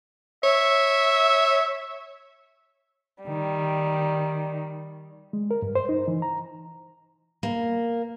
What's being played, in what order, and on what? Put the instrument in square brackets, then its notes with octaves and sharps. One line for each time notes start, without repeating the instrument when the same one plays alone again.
[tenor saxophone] C#5 [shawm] E5
[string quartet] D#3 G3
[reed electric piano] G#3
A#4
G2
C5
D#4
E3
A#5
[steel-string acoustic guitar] A#3